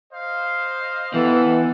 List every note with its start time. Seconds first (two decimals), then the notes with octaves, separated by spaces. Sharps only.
0.13 C5 D#5 F5
1.14 E3 B3 E4 G4 A4